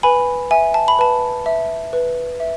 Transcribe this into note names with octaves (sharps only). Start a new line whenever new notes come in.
B4 G#5 B5
E5 G#5
A5
B5
B4 A5
E5
B4
E5